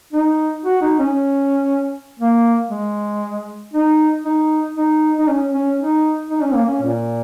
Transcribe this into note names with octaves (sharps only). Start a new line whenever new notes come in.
D#4
F#4
D#4
C#4
A#3
G#3
D#4
D#4
D#4
D#4
C#4
C#4
D#4
D#4
C#4
A#3
C#4
A#2